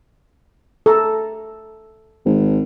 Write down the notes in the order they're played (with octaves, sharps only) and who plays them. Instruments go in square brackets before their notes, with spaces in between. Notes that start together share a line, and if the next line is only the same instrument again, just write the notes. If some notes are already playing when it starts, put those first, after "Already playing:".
[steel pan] A4 A#5
[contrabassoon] G#1